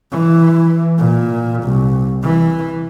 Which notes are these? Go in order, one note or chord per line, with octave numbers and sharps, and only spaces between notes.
E3
A#2
C2
E3